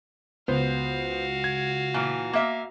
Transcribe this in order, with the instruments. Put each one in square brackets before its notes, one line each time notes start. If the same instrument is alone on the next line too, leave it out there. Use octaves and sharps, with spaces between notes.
[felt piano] C#2 [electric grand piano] B3 C5 [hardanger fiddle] F#4 F5
[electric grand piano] G#6
[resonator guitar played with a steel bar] A#2 E3
A#3 E5